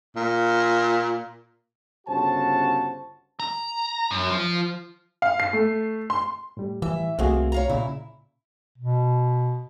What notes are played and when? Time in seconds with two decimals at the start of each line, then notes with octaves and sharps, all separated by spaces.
0.16 A#2
2.07 G1 C#3 F#4 C5 A5
3.40 A#5
4.11 F#2
4.30 F3
5.22 F5
5.40 C7
5.53 A3
6.10 C6
6.57 A2 G3
6.82 E3 E5
7.19 C2 A3 A#3 C4 F#4 G#4
7.52 C#5 F5 A#5
7.69 A#2 C#3 E4
8.78 B2